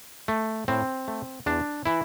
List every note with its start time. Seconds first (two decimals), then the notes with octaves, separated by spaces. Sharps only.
0.28 A3
0.68 A2 C4
1.08 A3
1.46 E2 D4
1.86 E3 E4